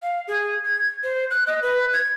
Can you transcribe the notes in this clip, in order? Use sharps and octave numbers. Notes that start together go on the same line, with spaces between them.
F5
G#4
G#6
C5
F#6
D#5
B4
G#6